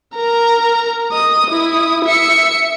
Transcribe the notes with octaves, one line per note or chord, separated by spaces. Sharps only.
A#4 A#5
D#5 D#6
E4 D#6
E5 C#7